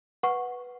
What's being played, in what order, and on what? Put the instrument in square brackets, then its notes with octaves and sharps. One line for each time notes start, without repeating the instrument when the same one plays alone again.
[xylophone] B4 F#5 C#6